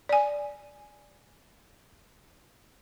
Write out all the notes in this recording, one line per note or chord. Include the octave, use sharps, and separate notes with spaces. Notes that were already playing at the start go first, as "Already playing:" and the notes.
D5 G#5